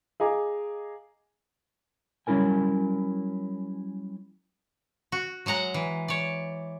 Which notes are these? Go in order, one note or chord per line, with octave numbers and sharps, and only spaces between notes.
G#4 D#5 F5 G#5 A#5 D6
F#3 G3 C#4 E4 A#4 G#5
F#4
F#3 G#3 F#5 A#5
E3
C#5 D5